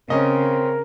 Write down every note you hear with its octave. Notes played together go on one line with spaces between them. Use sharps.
C#3 C4 C#4 A#4 D#5